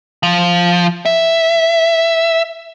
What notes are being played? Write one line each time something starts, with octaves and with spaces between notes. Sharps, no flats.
F3
E5